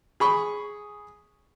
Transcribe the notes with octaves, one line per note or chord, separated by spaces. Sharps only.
G#4 B5 C#6